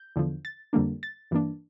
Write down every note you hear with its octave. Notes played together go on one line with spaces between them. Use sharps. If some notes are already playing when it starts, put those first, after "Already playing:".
Already playing: G6
E2 D3 F3
A6
F2 D3 G3 A#3 D4
A6
G2 E3 A#3 D4